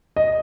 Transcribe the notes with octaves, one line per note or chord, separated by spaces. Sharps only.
D#5